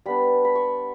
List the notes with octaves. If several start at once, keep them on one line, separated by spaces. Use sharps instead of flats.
G3 B3 D4 B5
B5
C#6